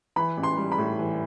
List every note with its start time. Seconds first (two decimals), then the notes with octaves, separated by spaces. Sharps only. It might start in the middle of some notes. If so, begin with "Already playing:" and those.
0.16 E3 B5
0.37 A1
0.43 C6
0.57 G3
0.72 B5
0.78 A2
0.99 E3